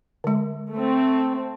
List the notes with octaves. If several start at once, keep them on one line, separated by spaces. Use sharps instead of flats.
D3 G#3
A3 C4